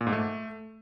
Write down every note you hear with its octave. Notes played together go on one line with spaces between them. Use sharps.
A#2
G#2
A3